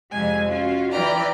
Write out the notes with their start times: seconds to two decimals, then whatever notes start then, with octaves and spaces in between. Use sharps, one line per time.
0.10 F2 C3 G#3 G#5
0.47 C#4 F4 F#4
0.91 E3 B4 D5 G5 A#5 F6